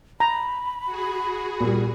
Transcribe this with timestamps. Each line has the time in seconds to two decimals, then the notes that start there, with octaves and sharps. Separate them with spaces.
0.20 A#5 B5
0.85 F#4 G#4
1.60 A#2 G3